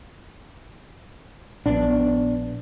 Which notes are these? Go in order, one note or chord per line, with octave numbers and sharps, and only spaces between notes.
A#1 B3 D4